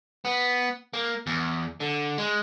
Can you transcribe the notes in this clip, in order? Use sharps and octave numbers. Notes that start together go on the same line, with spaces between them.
B3
A#3
E2
D3
G#3